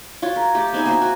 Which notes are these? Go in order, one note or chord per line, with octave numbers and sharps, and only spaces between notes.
F4 F#4 C#5
A#4
A3 G4
B3 C4 D#4 G#5
A#3 F#4 C5 E5
F#4